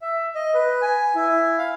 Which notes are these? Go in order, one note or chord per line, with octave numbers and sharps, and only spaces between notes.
E5
D#5
B4
G#5
E4
F5